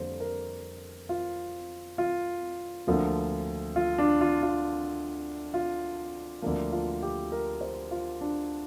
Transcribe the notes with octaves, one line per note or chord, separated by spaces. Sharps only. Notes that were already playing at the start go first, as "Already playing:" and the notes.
Already playing: F2 D3 G3 A#3 C5
A#4
F4
F4
D2 D3 F3 A#3
F4
D4
F4
F4
F4
D2 D3 F3 A#3 D4
F4
G4
A#4
C5
F4
D4